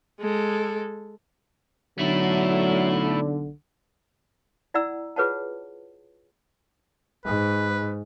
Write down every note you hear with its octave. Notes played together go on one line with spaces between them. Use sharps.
G#3 A4
B1 D3 F#3 A3 E4
E4 D5 F#5 G#5 A#5 E6
F4 G#4 B4 C#5 F#5 A5
G#2 B4